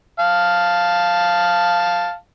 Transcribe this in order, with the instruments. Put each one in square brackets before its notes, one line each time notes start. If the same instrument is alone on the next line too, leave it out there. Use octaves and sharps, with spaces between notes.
[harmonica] F5 A5